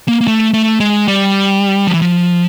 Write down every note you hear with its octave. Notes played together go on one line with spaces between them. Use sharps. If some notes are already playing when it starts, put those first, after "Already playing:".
A#3
A#3
A3
A3
G#3
G3
F3
E3
F3